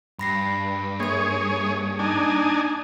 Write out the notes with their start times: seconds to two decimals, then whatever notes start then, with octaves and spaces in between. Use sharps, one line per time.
0.19 G2 B5 A#6 C7
1.00 A#3 G#4 C#5 G#6
1.99 D4 D#4 G#5